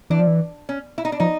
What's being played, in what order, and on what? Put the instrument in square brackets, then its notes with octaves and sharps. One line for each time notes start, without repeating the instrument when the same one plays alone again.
[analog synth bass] E3 [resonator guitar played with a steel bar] D4
[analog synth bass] F3
E3
[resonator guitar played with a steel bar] C#4
E4
D#4
D4
[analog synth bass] F3 [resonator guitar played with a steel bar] D#4